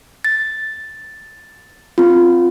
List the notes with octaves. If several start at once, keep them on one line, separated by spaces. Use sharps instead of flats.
A6
C4 F4